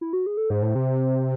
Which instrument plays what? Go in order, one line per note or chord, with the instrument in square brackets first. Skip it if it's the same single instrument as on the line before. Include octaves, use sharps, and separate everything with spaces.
[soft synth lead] E4
F#4
G#4
A4
[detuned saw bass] G#2 [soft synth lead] C5
[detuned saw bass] A2
C3